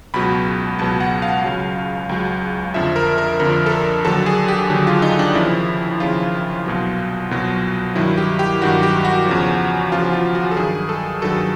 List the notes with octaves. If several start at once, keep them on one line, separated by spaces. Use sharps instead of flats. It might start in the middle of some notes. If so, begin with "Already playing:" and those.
C#2 B2 F#3 B5
C#2 B2 F#3 A5
F#5
F5
C#2 C#3 F#3
C#2 C#3 F#3
F2 D3 F3 E5
A#4
A#4
F2 D3 F3 A#4
A4
A#4
D#2 D3 F#3 A4
G#4
G4
D#2 D3 F#3
F4
D#4
D4
D#2 C#3 F3 E4
D#2 C#3 F3 F4
C2 B2 F#3
C2 B2 F#3
G2 D#3 F#3 E4
G4
G4
G2 D#3 F#3 F#4
G4
F#4
E2 C#3 F3
E2 C#3 F3 F4
F4
F#4
A4
G2 D#3 F#3 G#4
A4
G2 D#3 F#3 A4